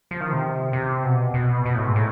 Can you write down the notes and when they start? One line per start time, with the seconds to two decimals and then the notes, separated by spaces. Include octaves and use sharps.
0.11 F3
0.21 D#3
0.32 C3
0.73 C3
1.04 B2
1.34 B2
1.66 B2
1.75 A2
1.86 G#2
1.96 A2